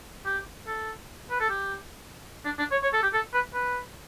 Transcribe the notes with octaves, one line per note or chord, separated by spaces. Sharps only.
G4
A4
B4
A4
G4
D4
D4
C#5
C#5
A4
G4
A4
B4
B4